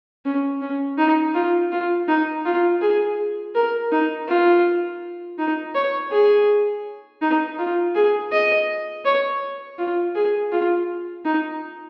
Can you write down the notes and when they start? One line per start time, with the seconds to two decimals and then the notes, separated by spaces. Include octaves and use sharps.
0.25 C#4
0.62 C#4
0.98 D#4
1.35 F4
1.72 F4
2.08 D#4
2.45 F4
2.82 G#4
3.55 A#4
3.92 D#4
4.28 F4
5.38 D#4
5.75 C#5
6.12 G#4
7.22 D#4
7.59 F4
7.95 G#4
8.32 D#5
9.05 C#5
9.79 F4
10.15 G#4
10.52 F4
11.25 D#4